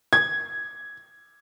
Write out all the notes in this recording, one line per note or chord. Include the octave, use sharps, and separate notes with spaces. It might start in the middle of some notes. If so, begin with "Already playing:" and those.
G#6